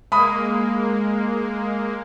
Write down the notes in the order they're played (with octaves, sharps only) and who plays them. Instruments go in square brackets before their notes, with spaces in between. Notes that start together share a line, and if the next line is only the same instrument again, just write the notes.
[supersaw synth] G#3 A#3 [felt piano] B5 D#6